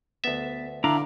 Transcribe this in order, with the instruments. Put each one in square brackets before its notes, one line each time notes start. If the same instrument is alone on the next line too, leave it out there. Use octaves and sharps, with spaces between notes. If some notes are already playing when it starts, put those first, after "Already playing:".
[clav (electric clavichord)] D2 E5 [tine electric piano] B3 A6 B6
[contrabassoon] D3 [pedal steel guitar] D4 E4 A#5 [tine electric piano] F5 D6